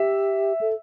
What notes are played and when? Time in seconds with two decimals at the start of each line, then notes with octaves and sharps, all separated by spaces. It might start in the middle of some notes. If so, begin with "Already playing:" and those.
Already playing: G4 E5
0.61 A4